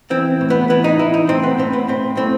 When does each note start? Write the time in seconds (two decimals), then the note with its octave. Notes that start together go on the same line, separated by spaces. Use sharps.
0.10 E3 C4
0.41 A2
0.50 B3
0.70 E3 B3
0.84 D#4
0.99 E3 E4
1.14 D#4
1.29 A2 C4
1.43 B3
1.58 A2 C4
1.73 B3
1.88 A2 C4
2.17 A2 C4